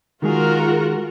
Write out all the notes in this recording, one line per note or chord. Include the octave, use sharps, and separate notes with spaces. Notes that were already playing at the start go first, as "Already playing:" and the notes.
D#3 G#3 F4 F#4 G#4 A#4